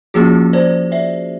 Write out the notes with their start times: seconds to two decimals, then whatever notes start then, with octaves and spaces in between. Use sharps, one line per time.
0.14 F3 A#3 C#4 F4 F#4 G#4
0.53 C5 D5
0.92 D5 E5